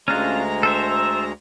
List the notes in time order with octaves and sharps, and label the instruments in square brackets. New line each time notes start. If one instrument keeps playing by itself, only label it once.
[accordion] D2 G#3 A#5 [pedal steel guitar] C#4 D4 F4
[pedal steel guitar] A4 C5 E5